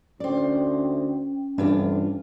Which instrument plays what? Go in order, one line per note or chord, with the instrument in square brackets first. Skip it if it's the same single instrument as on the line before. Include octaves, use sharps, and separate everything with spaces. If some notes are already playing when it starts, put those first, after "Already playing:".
[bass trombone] D2 [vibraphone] C#4 G5 [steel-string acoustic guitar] C5 D5
[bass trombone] F1 [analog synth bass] G2 [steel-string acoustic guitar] E3 D4 F4